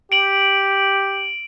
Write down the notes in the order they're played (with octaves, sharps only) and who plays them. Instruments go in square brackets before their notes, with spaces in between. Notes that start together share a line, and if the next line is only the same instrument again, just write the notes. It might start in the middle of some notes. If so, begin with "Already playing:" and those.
[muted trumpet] G4 [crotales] D7 F#7